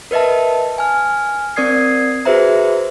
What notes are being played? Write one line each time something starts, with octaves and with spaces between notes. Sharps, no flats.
A#4 B4 D#5 E5 A5
G#5 F6
C4 A#4 D5 D#6 G#6 C7
F#4 G#4 B4 C5 E5 A#5